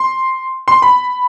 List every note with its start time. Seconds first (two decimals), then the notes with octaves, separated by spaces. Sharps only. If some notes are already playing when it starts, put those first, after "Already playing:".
Already playing: C6
0.68 C6
0.82 B5